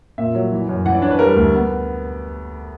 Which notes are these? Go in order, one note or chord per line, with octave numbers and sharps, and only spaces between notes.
A#2 E5
F#3
E3
F#2
E3 F#5
D5
D4 C#5
B4
G3 A#4
D2
B3